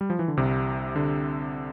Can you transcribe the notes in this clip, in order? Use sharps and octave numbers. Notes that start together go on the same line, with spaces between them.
G3
F3
E3
D3
C2 C3
D3